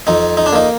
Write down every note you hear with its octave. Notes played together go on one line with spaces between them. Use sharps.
F2 D#4
D#4
D4
A#3 D#4